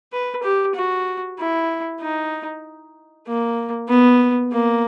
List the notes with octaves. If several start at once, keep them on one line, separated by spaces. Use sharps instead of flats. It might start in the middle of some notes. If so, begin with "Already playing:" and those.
B4
G4
F#4
E4
D#4
A#3
B3
A#3